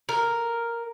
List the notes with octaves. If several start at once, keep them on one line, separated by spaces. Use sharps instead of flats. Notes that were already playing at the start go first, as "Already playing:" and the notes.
A#4